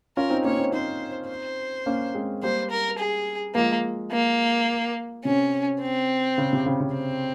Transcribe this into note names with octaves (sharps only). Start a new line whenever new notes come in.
C#4 F4 A#4
C4 D#4
A#3 C#4 C#5
C4 D#4
C4 D#4 C5
C5
A#3 C#4
G#3 C4
G3 A#3 C5
A#4
G#4
F3 G#3 A#3
A#3
C3 C#4
C4
C#3
C3
C#3
C#3
C4